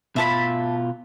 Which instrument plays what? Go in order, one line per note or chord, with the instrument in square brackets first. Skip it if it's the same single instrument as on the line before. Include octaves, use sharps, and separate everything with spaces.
[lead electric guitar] B2 F4 [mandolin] E5 A5 B5